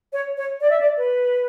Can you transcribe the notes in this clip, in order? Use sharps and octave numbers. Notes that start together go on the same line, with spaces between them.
C#5
C#5
D5
E5
D5
B4